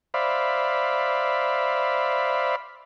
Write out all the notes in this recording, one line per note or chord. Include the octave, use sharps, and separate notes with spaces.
C5 D5 E5 F5 B5